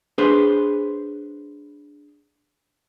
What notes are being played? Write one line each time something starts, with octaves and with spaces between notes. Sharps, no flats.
D4 G#4 B4 C5